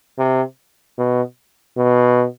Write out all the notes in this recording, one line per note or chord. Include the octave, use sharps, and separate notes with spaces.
C3
B2
B2